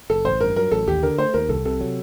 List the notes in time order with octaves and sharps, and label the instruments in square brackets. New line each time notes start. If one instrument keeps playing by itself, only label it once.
[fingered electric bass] F#1 [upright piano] A4
[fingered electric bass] A1 [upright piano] C5
[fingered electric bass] G2 [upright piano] A#4
[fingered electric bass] F#3 [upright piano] A#4
[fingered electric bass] A1 [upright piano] A4
[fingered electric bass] D#2 [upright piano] G4
[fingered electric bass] D3 [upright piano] A#4
[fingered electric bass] A3 [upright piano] C5
[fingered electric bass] D#2 [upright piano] A#4
[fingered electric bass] C2 [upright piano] A4
[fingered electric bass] C3 [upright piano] A4
[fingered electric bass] F#3